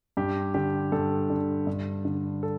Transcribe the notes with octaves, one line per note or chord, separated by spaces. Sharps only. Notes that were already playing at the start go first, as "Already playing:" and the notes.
G2 G4
D3 G4
G2 A4
D3
G2
D3
A4